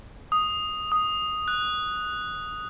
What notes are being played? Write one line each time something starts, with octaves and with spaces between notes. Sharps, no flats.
D#6
D#6
F#6